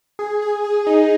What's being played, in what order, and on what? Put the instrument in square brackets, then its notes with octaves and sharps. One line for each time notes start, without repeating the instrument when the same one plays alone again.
[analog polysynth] G#4
G#4
G#4
D#4